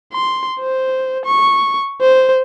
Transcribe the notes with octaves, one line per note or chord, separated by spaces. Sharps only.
C6
C5
C#6
C5